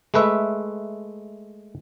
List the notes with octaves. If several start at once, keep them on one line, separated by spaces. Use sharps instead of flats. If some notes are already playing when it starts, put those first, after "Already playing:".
G#3 A3 B4 E5